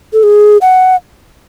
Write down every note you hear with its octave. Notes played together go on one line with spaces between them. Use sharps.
A4
G#4
F#5